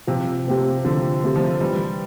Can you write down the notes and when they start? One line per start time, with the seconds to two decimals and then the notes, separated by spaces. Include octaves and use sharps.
0.07 C3 F3
0.46 A3 C4 G4
0.85 D3 F3
1.23 A3 C4 G4
1.36 F3
1.61 E3 G3